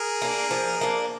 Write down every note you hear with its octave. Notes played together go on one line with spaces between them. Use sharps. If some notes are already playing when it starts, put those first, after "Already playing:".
Already playing: G#4 A#4
A#3 D4
F3
A#3 D4